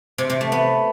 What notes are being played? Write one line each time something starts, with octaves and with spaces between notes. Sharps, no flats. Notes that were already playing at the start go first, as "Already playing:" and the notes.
C3
C3
A3
B3